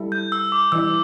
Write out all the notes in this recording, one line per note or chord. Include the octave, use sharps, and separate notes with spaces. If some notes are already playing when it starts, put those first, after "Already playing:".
Already playing: G3 E4 A4
G6
E6
D6
E3 G3 E4 E6